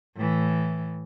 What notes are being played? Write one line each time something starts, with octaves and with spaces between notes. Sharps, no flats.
A2 E3